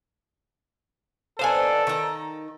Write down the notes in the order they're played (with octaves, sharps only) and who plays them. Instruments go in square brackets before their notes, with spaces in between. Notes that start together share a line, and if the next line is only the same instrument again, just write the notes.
[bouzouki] B3 D4 D#4 [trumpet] A4 [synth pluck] C5 F5 G#5
[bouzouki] D#3 A#5